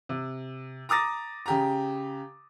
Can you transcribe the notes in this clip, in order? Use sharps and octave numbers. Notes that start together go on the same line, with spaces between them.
C3
A#5 D6 D#6 A6 A#6
C#3 G4 A#5